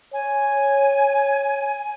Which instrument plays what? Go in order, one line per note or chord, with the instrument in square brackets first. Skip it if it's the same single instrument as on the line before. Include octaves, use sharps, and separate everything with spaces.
[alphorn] C#5 [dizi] G#5